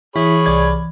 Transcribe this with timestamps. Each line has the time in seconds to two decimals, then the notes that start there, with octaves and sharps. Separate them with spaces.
0.16 E3 E4 G#4 C#5 B5
0.46 C2 D5 G#6